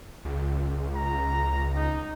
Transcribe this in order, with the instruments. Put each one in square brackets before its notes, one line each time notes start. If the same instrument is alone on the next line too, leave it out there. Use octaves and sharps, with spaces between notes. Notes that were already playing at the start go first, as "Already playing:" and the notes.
[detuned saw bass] C#2
[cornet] A#5
D#4